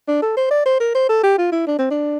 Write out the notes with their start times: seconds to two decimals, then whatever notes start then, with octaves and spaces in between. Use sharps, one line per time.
0.08 D4
0.22 A4
0.37 C5
0.51 D5
0.66 C5
0.80 A#4
0.95 C5
1.09 A4
1.23 G4
1.38 F4
1.52 E4
1.67 D4
1.79 C4
1.90 D4